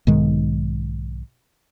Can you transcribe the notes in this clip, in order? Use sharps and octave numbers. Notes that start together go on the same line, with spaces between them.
B1 G#2 D#3 G#3